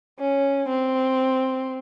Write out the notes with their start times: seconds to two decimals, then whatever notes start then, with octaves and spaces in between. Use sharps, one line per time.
0.20 C#4
0.69 C4